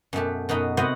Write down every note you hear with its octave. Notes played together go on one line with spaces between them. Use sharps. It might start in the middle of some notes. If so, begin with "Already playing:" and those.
F#2 B2 A3 G4
F#2 B2 B3 D#4
C3 B3 F#4 C5 D#5 F#5